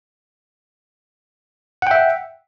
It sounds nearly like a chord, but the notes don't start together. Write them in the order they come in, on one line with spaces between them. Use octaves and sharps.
F#5 G5 E5